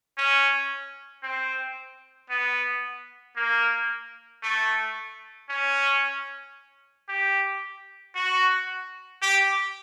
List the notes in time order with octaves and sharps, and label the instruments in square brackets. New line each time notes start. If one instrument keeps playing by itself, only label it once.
[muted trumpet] C#4
C4
B3
A#3
A3
C#4
G4
F#4
G4